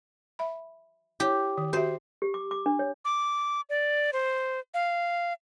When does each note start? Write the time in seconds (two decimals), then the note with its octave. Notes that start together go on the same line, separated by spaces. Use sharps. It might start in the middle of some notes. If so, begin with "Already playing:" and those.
0.39 E5 B5
1.20 E4 G4 C#5
1.58 D#3
1.73 F#4 G4 C5 E5
2.22 G4
2.34 D6
2.51 D6
2.66 D4
2.79 C#5
3.05 D6
3.69 D5
4.13 C5
4.74 F5